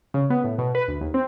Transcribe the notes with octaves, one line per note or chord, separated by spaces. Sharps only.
C#3
B3
A2
B2
B4
D2
D#2
C4